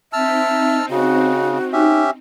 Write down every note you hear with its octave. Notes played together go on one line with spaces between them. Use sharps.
C4 D#4 E5 A5 E6 F6
C#3 F#4
C#4 D#4 G4 E5